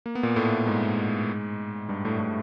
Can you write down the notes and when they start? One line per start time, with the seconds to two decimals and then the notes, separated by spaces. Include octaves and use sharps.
0.06 A#3
0.15 B3
0.23 A#2 A#3
0.36 A2 A3
0.66 G#2 G#3
1.89 G2 G3
2.05 A2 A3
2.19 A2 A3